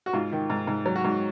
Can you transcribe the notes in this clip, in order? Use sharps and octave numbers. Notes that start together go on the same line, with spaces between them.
F#4
G#2 F4
D#3
G#2
G#2
F#3
F#4
G#2